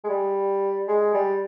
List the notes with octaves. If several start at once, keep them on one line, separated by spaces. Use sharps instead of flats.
G#3
G3
G#3
G3